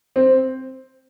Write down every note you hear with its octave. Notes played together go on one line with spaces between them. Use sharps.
C4